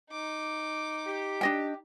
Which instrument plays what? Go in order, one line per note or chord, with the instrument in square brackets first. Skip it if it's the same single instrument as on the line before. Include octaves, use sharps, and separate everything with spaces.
[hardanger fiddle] D#4 D6
[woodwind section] G4
[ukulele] D4 D#5 G5